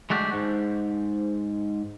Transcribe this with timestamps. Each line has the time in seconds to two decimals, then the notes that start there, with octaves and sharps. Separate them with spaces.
0.10 G#3 A3 D4 F#4 G4
0.33 G#2